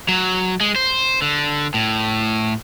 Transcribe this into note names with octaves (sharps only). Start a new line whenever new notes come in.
F#3
G#3
C5
D3
A2